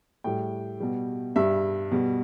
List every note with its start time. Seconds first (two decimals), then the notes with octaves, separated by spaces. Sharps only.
0.24 A2 G3 G5
0.80 B2 G3
1.36 G2 G3 E5
1.92 B2 G3